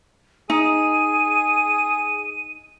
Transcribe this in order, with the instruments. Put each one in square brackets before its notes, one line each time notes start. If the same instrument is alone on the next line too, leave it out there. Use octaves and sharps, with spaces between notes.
[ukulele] D#4 [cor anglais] G#4 [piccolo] D#7